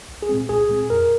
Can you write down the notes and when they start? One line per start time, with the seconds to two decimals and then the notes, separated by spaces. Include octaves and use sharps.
0.09 C2
0.22 G#4
0.29 A#2 G#3 C4
0.49 C2 G#4
0.69 A#2 G#3 C4
0.90 F2 A#4